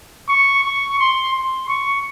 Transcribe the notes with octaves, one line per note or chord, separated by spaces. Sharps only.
C#6
C#6
C6
C6
C#6